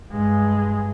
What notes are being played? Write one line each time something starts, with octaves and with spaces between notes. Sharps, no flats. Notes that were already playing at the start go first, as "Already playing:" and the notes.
G2 G#3